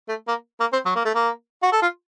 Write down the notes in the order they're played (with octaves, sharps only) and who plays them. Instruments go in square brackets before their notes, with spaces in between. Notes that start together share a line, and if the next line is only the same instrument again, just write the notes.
[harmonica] A3
A#3
A#3
C4
F#3
A#3
A3
A#3
F#4
A4
F4